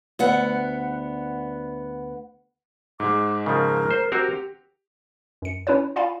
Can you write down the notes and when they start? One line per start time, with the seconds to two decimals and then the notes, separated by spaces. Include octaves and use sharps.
0.19 D2 B3 F#5
3.00 G#2 G#3 D6
3.46 C#3 F3 A#4
3.91 C5
4.12 C4 F#4 G4 A#4
5.42 F#2 C#7
5.67 C#4 E4 B4 C#5
5.96 F4 D5 F5 G#5 B5